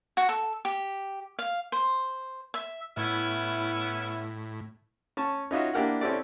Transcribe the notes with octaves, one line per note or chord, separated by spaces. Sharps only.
F#4
A4
G4
F5
C5
E5
A2 B3 C#4 E4
C#4 A5 C#6
C#4 D#4 F4 F#4 E5
A#3 D4 E4 G4 A#4 F#5
C4 C#4 E4 G4 A4 D5